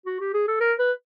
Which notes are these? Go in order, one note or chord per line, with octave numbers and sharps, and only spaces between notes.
F#4
G4
G#4
A4
A#4
B4